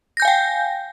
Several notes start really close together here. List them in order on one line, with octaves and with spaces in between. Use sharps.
A#6 G6 G#5 F5 G5